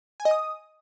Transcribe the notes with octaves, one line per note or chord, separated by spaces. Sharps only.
G#5
D#5
D#6